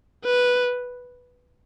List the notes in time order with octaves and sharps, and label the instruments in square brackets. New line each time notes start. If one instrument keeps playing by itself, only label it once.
[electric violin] B4